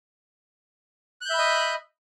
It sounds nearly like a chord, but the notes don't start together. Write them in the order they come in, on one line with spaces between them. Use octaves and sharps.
F#6 G6 E5 B5 D#5